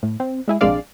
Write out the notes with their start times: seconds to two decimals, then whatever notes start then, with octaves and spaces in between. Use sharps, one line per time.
0.03 A2
0.20 C4
0.48 G#3 E4 G#4
0.61 A#1 C3 G#3 D4 D5 F5